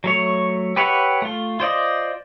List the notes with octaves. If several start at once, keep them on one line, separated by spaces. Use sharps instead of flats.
F#3 A3 C#5
G4 B4 C#5 E5 F#5
A3 F4
F4 C5 D5 D#5